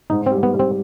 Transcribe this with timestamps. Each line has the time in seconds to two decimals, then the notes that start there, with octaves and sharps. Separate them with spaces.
0.10 G#2 D#4
0.26 G3 C4
0.43 B3
0.54 G3
0.59 C4